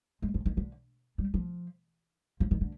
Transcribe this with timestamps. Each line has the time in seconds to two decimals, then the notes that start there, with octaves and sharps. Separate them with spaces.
0.22 G#3
0.34 F3
0.46 D#3
0.57 D3
1.18 G3
1.34 F3
2.40 F3
2.51 D#3
2.61 D3